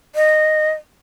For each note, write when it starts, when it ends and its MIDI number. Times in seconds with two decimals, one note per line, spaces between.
0.15 0.71 75